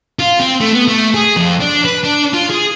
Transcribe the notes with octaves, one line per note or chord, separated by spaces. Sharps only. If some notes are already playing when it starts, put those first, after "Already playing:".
F4
C4
A3
B3
A3
G#4
F2
D4
B4
D4
F4
G#4